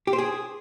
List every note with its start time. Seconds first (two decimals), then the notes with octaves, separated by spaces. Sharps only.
0.07 G4
0.13 C5
0.18 G#4